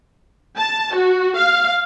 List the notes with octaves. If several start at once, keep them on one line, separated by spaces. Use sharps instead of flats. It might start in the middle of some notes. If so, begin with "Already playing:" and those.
A5
F#4
F5